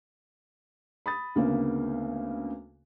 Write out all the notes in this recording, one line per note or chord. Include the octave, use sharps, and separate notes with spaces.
B5 D#6 A6
D2 C#3 A#3 B3